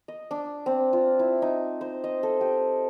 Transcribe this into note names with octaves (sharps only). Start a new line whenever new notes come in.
D#5
D4
C4
F4
E4
D#4
C5
D#5
A4
G4